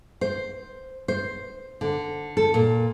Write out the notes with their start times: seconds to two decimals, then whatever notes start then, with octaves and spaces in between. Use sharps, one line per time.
0.21 C5
1.08 C5
1.81 D3
2.37 A4
2.54 A#2